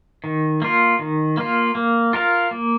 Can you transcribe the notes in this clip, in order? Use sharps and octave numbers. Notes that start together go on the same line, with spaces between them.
D#3
A#3 F4
D#3
A#3 F4
A#3
F4 A#4 F5
A#3